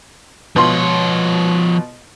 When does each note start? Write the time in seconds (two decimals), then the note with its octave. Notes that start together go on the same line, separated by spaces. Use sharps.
0.56 B2 F3 F4 C#5 C6